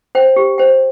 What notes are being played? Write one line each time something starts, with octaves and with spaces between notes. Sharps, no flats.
C5 G5
G4
C5 G5